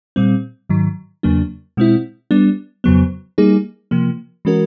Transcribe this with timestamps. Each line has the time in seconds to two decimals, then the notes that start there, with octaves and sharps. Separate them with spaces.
0.16 A#2 G3 C4
0.69 G#2 D#3 F#3
1.23 E2 C#3 F#3 A#3 D4
1.77 B2 G#3 C4 E4
2.31 G3 B3 D4
2.84 F2 C#3 F#3 B3
3.38 G3 A#3 D#4 G#4
3.91 C3 F3 A#3
4.45 E3 G#3 C#4 F#4 A#4